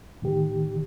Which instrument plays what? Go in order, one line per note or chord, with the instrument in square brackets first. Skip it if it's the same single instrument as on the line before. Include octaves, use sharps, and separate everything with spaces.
[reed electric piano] A2 D#3 G4